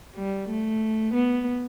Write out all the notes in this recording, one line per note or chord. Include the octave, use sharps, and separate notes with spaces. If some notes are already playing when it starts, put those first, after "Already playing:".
G3
A3
B3